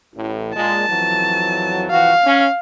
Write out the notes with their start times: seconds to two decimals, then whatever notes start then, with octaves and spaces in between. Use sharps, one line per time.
0.15 A1 A2
0.55 A#2 G#3 A5
0.89 F2 E3 F#3
1.91 E3 F3 F#4 F5
2.26 C#4